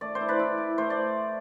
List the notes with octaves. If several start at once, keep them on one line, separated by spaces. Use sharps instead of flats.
A3 D5
C5
E4
B4 D5
E4
E4
A3 C5
D5